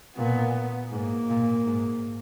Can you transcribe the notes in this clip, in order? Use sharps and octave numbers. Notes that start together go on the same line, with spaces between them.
A#2 B3
G#2 A#3
A#2
G#2